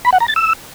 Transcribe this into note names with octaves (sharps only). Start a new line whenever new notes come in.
B5
F#5
A#5
A6
E6